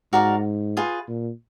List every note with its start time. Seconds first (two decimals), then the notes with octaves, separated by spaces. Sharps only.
0.13 G#2 F#4 A#4 D5 F5
0.77 F4 G#4 B4
1.08 A#2